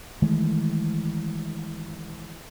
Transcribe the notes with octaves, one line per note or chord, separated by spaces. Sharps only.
D#3 E3 G#3 A3